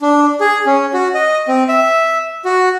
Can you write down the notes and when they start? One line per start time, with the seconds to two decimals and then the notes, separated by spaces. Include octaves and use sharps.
0.01 D4
0.40 G#4
0.66 C#4
0.93 F#4
1.14 D#5
1.48 C4
1.68 E5
2.45 F#4